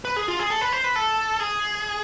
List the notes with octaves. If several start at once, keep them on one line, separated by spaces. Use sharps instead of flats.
B4
G#4
F4
G#4
A4
B4
C5
B4
A4
G#4